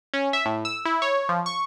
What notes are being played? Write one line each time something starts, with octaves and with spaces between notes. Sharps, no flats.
C#4
E5
A2
E6
E4
C#5
F3
C#6